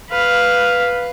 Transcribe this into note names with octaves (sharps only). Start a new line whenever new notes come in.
B4 F5